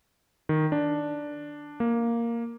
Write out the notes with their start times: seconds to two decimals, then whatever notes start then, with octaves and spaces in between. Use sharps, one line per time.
0.49 D#3
0.72 D4
1.80 A#3